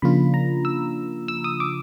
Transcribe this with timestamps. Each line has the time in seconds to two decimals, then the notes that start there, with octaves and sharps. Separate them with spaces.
0.02 C#3 F3 A#3 D4 F4 B5
0.34 A#5
0.65 E6
1.28 E6
1.44 D#6
1.60 D6